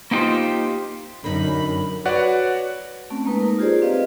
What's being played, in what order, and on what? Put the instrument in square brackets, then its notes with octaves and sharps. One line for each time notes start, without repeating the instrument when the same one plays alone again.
[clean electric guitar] A#3 B3 D#4 F4 G4 C5
[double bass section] F#2 [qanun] D3 D#4 [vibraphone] A#4 [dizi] B5
[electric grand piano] F#4 B4 C#5 D5 F#5
[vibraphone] A3 C4 C#4
G#3 A#3 D#4 B4 A#5
D#4 A#4
F4 G4 G#4 C5 D5
C4 B4 D#5 F5